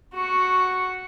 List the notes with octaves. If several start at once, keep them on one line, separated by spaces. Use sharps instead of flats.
F#4 C#6